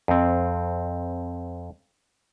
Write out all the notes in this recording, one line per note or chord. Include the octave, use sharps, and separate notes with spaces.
F2 C4